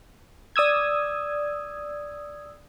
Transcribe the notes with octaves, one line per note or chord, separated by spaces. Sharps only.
D5 D#6 E6 G#6